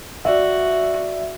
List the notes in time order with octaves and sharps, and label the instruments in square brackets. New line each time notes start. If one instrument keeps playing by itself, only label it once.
[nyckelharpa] F#4 [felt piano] D5 E5